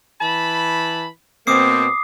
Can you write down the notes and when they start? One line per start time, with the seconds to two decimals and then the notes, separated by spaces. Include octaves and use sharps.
0.21 E3 A5 B5
1.47 B2 A#3 C4 D6 D#6 C7